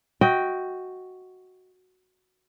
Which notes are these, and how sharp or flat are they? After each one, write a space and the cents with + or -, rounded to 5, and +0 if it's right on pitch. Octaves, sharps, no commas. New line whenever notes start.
F#4 +0 D#5 +35 G5 +0